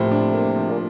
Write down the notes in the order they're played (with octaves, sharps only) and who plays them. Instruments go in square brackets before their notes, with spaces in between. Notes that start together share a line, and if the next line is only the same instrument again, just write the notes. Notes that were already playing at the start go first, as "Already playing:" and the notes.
Already playing: [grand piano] A2 F3 A#3 [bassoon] C3
[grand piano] D4
A#3
F3
[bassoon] A#2